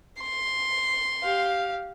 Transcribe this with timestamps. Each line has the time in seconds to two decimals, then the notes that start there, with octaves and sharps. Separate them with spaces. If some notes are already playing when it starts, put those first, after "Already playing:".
0.20 C6
1.23 G4 F5